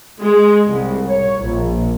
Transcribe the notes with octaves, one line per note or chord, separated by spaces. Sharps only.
G#3
C2
C#5
A#1